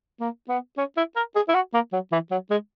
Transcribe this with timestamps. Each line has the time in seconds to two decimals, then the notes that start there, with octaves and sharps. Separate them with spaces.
0.20 A#3
0.49 B3
0.77 C#4
0.97 E4
1.16 A#4
1.35 G#4
1.48 E4
1.54 F#4
1.73 A#3
1.92 F#3
2.12 E3
2.31 F#3
2.50 G#3